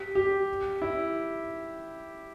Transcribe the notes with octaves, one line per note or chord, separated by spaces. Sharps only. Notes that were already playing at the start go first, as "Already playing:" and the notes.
Already playing: G4
G4
E4